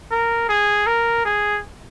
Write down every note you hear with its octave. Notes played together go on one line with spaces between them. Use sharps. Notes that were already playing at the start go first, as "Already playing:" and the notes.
A#4
G#4
A#4
G#4